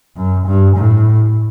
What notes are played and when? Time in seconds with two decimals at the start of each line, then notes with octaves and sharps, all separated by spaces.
0.17 F#2
0.47 G2
0.76 A2